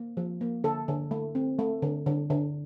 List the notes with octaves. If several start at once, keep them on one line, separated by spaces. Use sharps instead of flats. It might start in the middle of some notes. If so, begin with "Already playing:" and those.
Already playing: A#3
F3
A#3
D3 A4
D3
A3
C4
A3
D3
D3
D3